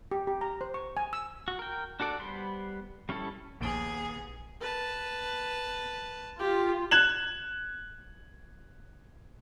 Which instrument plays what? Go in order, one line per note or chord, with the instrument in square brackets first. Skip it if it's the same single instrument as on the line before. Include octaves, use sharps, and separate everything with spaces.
[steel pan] G4
G4
A#5
C5
C#6
G#5
E6
[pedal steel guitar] F#4
A#4 G5
D4 F#4 A4 D5
G3 B3 C5 B5 C6
G3 C#4 E4 A4
[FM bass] A#1 [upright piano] D#2 D7 G7 [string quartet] B3 G#4
[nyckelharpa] B4 A5
[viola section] F4 [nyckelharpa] G4
[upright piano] F#6 G#6 E7 F#7